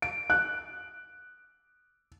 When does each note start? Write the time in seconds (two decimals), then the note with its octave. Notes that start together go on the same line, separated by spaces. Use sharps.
0.02 D7
0.30 F#6